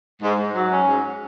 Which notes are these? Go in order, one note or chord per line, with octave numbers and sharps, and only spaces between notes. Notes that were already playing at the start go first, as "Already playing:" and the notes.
G#2
G#2
F#3
C#4
G#2